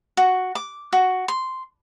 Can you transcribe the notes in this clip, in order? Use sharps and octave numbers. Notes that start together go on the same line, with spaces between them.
F#4
D6
F#4
C6